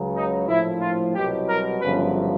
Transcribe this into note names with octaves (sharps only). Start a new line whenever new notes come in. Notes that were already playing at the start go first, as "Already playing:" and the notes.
Already playing: C#2 C#3 F#3
D#4
A#1 A2 F3 E4
F4
C2 B2 F#3 G4
A#4
G1 F#2 C#3 F3 B4